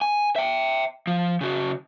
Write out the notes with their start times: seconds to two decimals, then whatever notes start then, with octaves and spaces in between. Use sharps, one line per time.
0.01 G#5
0.36 E5 G5
1.07 F3
1.41 C#3 F#4